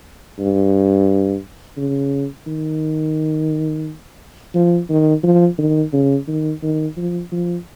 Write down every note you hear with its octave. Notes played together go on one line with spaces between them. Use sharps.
G2
C#3
D#3
F3
D#3
F3
D#3
C#3
D#3
D#3
F3
F3